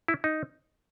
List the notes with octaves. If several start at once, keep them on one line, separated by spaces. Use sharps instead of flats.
E4
D#4